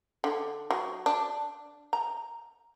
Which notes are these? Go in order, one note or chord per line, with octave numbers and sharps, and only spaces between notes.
D3
F#3
D4
A#5